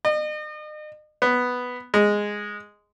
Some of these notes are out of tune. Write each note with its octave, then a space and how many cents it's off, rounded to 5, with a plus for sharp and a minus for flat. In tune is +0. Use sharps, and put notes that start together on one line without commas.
D#5 -40
B3 +0
G#3 -10